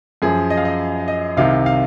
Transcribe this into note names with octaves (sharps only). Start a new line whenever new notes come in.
F#2 F3 G#4
D#5
F5
D#5
D#5
C2 C3 D#3 F5
F5